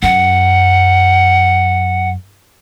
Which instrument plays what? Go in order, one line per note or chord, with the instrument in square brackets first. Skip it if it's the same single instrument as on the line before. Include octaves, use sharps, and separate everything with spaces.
[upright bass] F#2 [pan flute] F#5